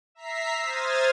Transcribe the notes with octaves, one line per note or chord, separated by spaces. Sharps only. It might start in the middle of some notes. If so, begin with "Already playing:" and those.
E5 A#5 B6 C7
C5 D#6 F6 G#6 A6